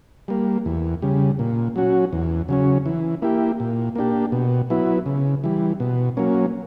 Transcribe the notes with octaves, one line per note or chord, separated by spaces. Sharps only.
G3 A#3
E2
C#3 G3
A#2
F#3 C#4 F#4
E2
C#3 F#3 C#4
E3
A#3 E4 G4
A#2
A#3 D4 G4
B2
F#3 B3 E4
C#3
E3 G3
B2
F#3 A#3 C#4